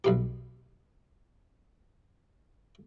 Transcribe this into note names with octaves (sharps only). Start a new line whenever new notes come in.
B1 B2 G4